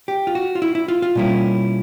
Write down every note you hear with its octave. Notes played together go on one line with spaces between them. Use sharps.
G4
F4
F#4
F4
E4
E4
F4
F4
B2 G3 A#3 C#4 E4